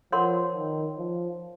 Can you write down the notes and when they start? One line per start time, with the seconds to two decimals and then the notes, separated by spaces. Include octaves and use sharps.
0.12 F3 A#4 C#5 F#5 C6
0.56 D#3
0.98 F3